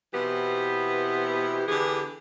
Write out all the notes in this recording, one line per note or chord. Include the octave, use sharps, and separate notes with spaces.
B2 E3 B3 C4 E4 G4
D3 E3 B3 G4 G#4